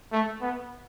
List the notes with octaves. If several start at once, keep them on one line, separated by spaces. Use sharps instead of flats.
A3
B3